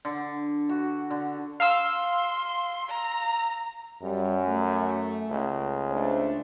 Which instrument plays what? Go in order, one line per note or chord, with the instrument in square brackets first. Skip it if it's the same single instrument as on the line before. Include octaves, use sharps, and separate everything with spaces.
[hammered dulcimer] D3
F#4
D3
[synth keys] F5 E6 [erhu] C6
[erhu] A#5
[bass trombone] F#2 [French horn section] G3
[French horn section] A3
[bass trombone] C#2
[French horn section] A3 D4 C5